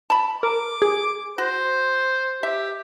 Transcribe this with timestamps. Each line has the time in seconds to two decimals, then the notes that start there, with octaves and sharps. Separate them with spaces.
0.10 A5 B5
0.43 A#4 D6
0.82 G#4
1.38 F#4 C5
2.43 G4 E5